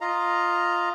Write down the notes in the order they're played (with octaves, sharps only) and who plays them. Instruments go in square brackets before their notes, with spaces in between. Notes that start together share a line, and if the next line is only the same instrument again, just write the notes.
[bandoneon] F4 D#5 F5 A#5